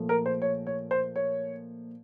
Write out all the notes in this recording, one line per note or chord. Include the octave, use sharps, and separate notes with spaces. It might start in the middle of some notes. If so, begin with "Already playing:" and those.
Already playing: A#2 F3 A3
A#4
C5
C#5
C#5
C5
C#5